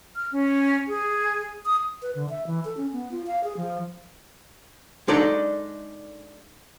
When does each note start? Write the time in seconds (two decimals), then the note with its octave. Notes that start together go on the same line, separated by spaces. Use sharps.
0.15 F6
0.32 C#4
0.88 G#4
1.66 D#6
2.02 B4
2.15 D3
2.30 E5
2.47 E3
2.65 A4
2.77 C#4
2.93 B3
3.11 F4
3.27 F5
3.44 G#4
3.57 F3
5.08 G#3 D4 D#4 A4 D5